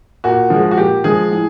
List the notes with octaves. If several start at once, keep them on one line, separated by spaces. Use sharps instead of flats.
A#2 F#4
F3 G#3
F#4
A#2 G4
F3 G#3 G#4
A2